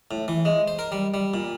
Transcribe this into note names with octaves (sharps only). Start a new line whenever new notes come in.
A2
E3
G#3
C5
A#4
G3
G3
A#2